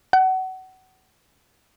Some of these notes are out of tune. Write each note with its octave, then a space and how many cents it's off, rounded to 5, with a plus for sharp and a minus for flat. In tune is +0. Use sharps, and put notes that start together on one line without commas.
F#5 +25